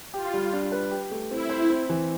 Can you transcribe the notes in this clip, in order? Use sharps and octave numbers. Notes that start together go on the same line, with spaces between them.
F4 G4
G3
D4
B4
G4
A3
C4 E4
C5
C4
E3